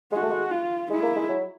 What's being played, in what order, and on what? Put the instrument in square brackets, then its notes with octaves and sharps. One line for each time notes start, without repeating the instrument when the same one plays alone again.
[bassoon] G#3 [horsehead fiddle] F#4
[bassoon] A3
G#3
[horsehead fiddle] F4
[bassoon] G#3 [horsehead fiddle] E4
[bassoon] A#3
G#3
F#3